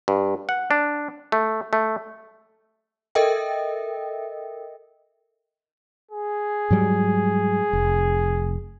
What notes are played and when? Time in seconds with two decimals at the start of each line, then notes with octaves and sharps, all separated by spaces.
0.08 G2
0.49 F#5
0.71 D4
1.32 A3
1.73 A3
3.15 A4 A#4 D#5 E5 G5
6.11 G#4
6.70 G#2 F#3 G3
7.73 F1